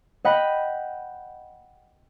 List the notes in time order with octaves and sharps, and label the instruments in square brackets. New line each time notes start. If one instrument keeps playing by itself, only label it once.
[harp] D#5 F#5 G5 B5